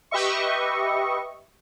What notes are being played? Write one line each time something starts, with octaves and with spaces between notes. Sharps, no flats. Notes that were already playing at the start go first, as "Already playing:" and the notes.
G4 B4 D#5 E5 C#6